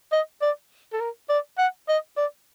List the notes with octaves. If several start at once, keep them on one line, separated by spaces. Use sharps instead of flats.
D#5
D5
A4
A#4
D5
F#5
D#5
D5